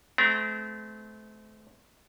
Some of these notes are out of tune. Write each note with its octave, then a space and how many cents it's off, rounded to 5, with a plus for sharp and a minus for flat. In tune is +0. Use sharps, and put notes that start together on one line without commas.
A3 -35 C4 -35 A#5 +25